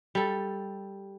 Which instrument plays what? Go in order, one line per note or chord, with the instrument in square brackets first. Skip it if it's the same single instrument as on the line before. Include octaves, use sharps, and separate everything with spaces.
[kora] G3 A4